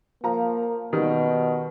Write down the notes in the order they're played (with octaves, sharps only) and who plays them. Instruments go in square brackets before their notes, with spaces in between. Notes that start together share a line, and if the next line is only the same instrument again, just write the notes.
[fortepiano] F3 A#5 [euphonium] A#3
[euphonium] B2 [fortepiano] D#3 G3